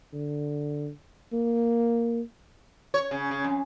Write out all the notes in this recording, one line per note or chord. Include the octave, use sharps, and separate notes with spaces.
D3
A#3
C#5
C#3
C#3
F2